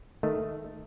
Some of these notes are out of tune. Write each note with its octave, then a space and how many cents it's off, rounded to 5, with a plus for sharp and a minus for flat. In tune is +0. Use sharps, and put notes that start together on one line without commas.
D#3 -5 A3 +0 D#5 +0